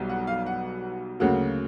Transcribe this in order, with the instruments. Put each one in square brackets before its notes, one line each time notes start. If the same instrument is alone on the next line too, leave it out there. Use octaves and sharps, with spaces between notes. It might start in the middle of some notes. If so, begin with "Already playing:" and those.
Already playing: [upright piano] B1 B2 G3
F#5
F5
F#5
D2 C#3 F#3 A#3 F#5